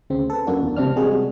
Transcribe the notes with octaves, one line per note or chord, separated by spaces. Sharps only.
D2 C#3 C4
A4 B4
F#2 A#3 D4 F#4
E2
C#2 C3 C4 D4 F6
C3 G3 G#3 F#4 G#4